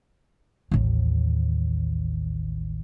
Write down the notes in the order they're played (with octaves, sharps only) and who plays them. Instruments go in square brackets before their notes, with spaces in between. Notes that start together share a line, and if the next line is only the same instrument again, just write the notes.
[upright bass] A1 D#2